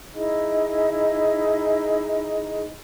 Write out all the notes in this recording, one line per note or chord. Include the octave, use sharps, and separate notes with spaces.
D#4 E4 G#4 D#5